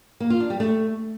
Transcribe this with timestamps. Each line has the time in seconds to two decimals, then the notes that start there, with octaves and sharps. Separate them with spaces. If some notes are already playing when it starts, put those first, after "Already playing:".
0.20 A#3
0.30 F4
0.40 D4
0.50 G3
0.60 A3